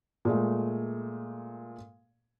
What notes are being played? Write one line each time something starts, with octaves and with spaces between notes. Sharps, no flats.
A#2 G#3 A3